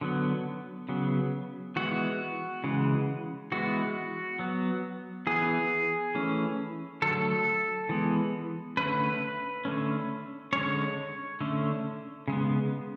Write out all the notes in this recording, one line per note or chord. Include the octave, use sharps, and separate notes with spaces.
D3 F#3 B3
C#3 F#3 B3
E3 G#3 B3 F#4
C#3 E3 G#3
E3 G#3 B3 F#4
F#3 B3
E3 B3 G#4
E3 A3 C#4
D3 F#3 A3 A4
E3 G#3 B3
D3 A3 C#4 B4
D3 A3 C#4
D3 G#3 C#4 C#5
D3 A3 C#4
C#3 G#3 B3